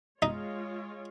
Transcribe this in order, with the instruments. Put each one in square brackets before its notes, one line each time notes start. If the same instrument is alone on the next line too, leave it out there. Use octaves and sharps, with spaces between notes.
[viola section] G#3 F4 C#5 [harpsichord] D#4